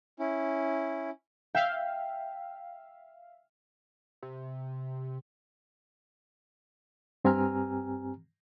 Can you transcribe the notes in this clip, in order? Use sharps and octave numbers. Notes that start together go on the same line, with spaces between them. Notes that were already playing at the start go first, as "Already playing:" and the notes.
C#4 E4
E5 F5 G5
C3
G2 C4 G4 G#5 A#5 F6